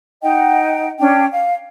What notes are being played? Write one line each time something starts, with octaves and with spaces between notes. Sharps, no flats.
D#4 D#5 F#5 G5
C#4 D4 G5
F5